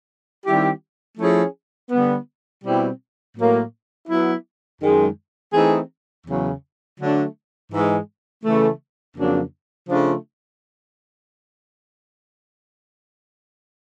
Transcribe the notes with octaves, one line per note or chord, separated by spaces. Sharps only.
D#3 G3 C4 E4 G4
F3 A3 C#4 E4 G#4
D3 G3 B3
B2 G3 C4 E4 G4
A2 F#3 A#3
F#3 B3 E4
F#2 D#3 G#3
E3 A3 C4 D#4 G#4
E2 C#3 F#3
D3 F#3 A3 D4
G#2 E3 G#3
C#3 E3 A3
F2 C#3 F#3 A#3 D4
C#3 F3 A3 D4 F4